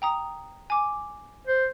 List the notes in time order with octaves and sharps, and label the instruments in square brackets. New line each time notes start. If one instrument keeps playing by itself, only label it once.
[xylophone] G5 A#5 D#6
G#5 D6
[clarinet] C5